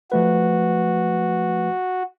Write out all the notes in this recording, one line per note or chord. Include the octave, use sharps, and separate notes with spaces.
F3 A3 F#4 B4